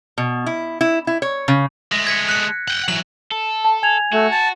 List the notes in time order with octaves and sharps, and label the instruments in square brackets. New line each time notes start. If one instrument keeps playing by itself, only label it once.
[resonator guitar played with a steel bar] B2
E4
E4
E4
C#5
C#3
[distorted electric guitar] G#3 A3 [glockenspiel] A#6
[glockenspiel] G#6 B6 C#7
F#6 C#7
[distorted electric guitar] F#5 G5
[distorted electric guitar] E3 F#3 [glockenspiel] F#7
[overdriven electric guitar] A4
[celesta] A5
G#5 G#6 F7
[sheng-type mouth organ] A3 [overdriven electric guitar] F#4
[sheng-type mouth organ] A5